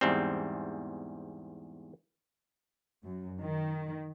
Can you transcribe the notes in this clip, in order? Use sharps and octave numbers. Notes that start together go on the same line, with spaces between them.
E2 G#2 G3 C4
F#2
D#3